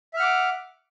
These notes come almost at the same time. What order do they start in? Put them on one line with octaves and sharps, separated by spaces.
E5 F6 F#5 D6